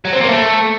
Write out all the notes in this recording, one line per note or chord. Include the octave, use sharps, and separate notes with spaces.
F#3
C4
A#3
A3